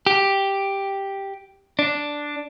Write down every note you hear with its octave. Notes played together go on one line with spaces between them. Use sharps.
G4
D4